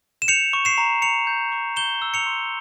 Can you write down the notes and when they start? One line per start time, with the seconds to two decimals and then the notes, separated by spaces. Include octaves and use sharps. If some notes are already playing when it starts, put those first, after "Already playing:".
0.22 E7
0.28 G6 C#7 F7
0.53 C#6
0.65 C7 E7
0.78 A#5
1.02 A#5 C#7 F7
1.27 G6
1.52 C#6
1.76 G6 E7 G7
2.02 E6
2.14 C#7 F7
2.26 C6